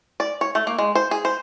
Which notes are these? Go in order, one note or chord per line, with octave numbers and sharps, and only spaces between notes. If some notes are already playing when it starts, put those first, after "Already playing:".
D5
C#5
A3
A#3
G#3
C5
G#4
C5